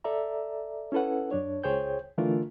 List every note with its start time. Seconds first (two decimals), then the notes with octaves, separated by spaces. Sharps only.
0.04 A4 D5 E5 A#5
0.92 C#4 E4 A4 B4 F#5
1.31 F#2 D4 C#5
1.64 C#2 G#4 C5 C#5 G5 G6
2.18 D3 E3 A3 D4 F4 A#4